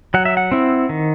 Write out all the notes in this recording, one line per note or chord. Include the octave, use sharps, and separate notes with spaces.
F#3 F#5
E5
F#5
C4 E4
D#3